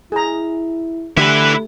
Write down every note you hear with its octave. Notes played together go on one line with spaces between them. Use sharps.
E4 G#4 A#5
D3 A3 E4 G4 B4